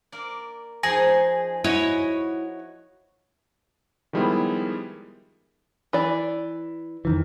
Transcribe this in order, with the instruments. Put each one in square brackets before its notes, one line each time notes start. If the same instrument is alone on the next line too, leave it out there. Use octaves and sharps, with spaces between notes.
[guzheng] A#3 A#4 D5
[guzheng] F3 D#4 [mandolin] G#4 [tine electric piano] G#5 A#6
[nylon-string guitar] E4 [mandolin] F#4 C#5 D#5
[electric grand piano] D#3 F3 G3 G#3 B3 E4
[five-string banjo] E3 D5
[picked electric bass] F2 D#3 E3